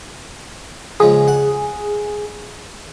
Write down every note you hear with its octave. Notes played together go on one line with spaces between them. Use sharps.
C#3 F3 G#3 G#4
F#5